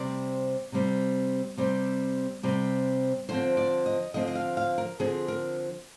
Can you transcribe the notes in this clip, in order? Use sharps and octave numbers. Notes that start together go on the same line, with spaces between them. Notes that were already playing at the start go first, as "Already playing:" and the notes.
Already playing: C3 G3 C4 D5
C3 G3 C4
C3 G3 C4
C3 G3 C4
D3 F3 C4 C5
D5
D#5
D3 F3 C4 D#5
D#5
F5
F5
A#4
D3 F3 C4 G#4
A#4